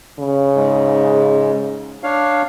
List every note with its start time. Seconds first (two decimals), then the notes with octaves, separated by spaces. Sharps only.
0.19 C#3
0.56 G#2 G#3
2.03 D4 C#5 F5